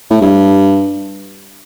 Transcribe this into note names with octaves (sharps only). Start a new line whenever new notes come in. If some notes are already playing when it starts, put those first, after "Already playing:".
A2
G2